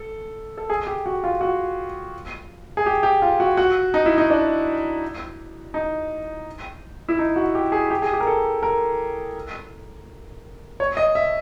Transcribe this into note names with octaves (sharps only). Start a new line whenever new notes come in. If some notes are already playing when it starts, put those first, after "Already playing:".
Already playing: A4
A4
G#4
G4
F#4
F4
F#4
G#4
G4
G4
F4
F#4
F#4
D#4
E4
D#4
D4
D#4
E4
D#4
F#4
G4
G#4
G4
G#4
G4
A#4
A4
A#4
C#5
D#5
E5